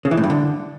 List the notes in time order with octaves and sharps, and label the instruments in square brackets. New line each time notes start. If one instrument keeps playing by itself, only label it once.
[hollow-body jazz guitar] C#3
E3
A2
G2
D3